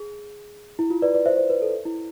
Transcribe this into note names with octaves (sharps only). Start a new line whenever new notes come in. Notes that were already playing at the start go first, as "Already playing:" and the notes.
Already playing: G#4
E4
F4
B4 D5
B4 D5
C5 E5
C5
B4
A4
E4